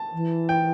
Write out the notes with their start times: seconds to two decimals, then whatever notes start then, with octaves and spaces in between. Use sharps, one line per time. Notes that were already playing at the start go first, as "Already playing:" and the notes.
Already playing: A5
0.13 E3
0.49 G5